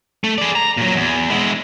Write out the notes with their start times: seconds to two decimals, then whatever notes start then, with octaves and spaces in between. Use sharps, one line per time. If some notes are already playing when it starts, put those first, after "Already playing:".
0.24 A3
0.38 G#4 D5
0.56 A#5
0.77 A#2 F#3
0.95 E2
1.30 G#3 E4